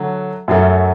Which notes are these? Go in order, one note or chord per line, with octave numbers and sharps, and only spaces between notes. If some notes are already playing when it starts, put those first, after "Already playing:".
Already playing: D3 F#3 A3
F#2 F#3 A3